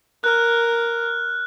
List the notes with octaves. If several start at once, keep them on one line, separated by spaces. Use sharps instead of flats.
A#4 F6 F#6